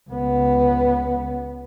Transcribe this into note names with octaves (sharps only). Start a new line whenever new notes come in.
C#2 B3